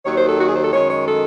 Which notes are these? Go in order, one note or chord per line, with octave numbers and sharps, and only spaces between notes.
D#2 D#3 F#3 C#5
C5
A4
F#4
G#4
C5
A4
F#2 D#3 G#3 C#5
C#5
A4